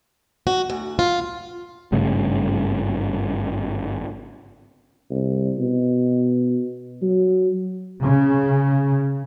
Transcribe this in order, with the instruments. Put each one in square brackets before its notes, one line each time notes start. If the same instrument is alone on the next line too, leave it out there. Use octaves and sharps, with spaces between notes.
[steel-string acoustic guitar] F#4
D2
F4
[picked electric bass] G#1 G2 C#3 A3
[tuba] C2
B2
F#3
[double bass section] C#3